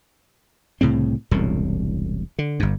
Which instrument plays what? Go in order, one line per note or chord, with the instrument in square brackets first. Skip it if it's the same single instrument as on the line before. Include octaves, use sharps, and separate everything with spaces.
[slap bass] C2 A2 C#3 C4
E1 C2 F#2 A2
D3
G1 G2